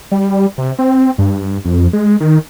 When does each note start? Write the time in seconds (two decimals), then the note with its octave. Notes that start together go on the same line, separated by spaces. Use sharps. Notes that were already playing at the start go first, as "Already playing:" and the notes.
0.12 G3
0.58 C3
0.79 C4
1.18 G2
1.65 F2
1.93 G#3
2.20 D#3